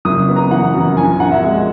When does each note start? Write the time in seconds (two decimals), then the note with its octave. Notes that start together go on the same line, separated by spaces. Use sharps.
0.05 F#1 D#6
0.28 B3
0.36 A#5
0.51 E3 F#5
0.74 F#2
0.97 A#1 G#5
1.20 A#1 F#5
1.31 E5
1.43 G#3